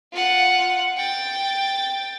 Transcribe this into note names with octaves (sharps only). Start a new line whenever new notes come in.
F4 F#5
G5 A6